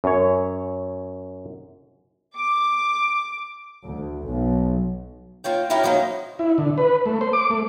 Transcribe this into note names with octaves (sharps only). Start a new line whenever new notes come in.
F#2 C#5
D6
D2
B1
A#3 F4 C#5 G5
F#2 C#4 E4 A#4 G5
F3 F#3 G#3 A#3 C#4 D#4
E4
D3
B4
A3
C5
D6
A3